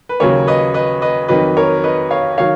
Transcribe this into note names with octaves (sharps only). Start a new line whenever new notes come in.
B4
D#2 C#3 F#3 A#4 C#5
B4 D#5
B4 D#5
B4 D#5
F2 D#3 F#3 B4 D#5
A#4 C#5
B4 D#5
C#5 F5
D#3 F#3 C#5 F5